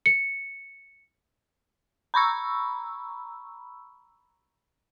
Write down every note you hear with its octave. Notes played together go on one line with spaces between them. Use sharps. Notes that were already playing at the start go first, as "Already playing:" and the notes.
C#7
A#5 B5 C#6 E6